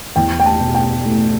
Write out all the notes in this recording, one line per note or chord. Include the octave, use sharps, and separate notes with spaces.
E2 G5
G5
A5
B2
G5
A3